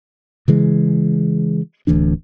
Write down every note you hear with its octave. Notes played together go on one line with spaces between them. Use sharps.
C#3 E3 G#3
D1 D2 E3 D4